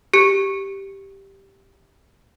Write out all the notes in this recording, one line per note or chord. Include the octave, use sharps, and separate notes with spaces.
G4 C#7